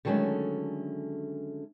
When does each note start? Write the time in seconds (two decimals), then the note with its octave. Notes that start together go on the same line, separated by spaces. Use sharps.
0.05 D3 D#3 F#3 G#3 A3 C#4